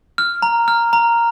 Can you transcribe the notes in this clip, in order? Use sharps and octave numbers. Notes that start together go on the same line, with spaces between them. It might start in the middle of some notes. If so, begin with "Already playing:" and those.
F6
A#5
F6
A#5